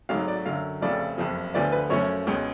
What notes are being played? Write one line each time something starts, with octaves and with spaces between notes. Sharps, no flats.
G#1 G#2 F#3 A3 F5
D5
F#2 D3 F#3 F5
F1 F2 C#3 F3 A3 D5
F#1 F2 F3
D2 D3 F3 B3 D5
B4
F#2 F3 A3 C#4 C#5
C#2 B2 G#3 C#4